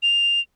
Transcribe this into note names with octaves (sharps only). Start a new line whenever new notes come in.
F7